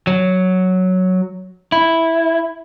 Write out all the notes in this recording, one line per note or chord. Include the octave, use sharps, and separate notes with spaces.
F#3
E4